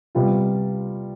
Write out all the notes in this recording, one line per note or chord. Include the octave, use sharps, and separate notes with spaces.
C3 G3 B3 F4